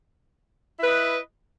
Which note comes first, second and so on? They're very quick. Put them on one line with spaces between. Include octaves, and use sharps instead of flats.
E4 B4 D#5